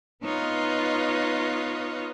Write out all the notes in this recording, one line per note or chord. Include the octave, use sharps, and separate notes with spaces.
B3 D#4 F4 B4 C#5 D#5